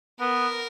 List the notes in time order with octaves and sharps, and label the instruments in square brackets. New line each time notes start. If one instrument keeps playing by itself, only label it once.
[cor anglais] B3 [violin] A#4